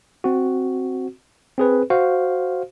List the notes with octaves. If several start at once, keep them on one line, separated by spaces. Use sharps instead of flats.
C4 F#4
C4 G#4 B4
F#4 C5 F5